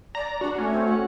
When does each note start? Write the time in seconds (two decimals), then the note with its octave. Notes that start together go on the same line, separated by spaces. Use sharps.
0.15 D5 A#5
0.41 D4 F#4
0.58 A3 C#4
0.72 C4
0.84 F#4